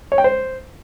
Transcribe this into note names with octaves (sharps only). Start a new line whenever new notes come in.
C#5
G5
C5